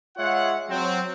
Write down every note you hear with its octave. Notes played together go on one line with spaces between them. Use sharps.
G#3 F4 C#5 E5 F#5
F#3 C4